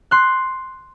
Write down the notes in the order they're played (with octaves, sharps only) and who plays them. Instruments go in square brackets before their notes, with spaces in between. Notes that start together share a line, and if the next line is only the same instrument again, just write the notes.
[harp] C6 F#6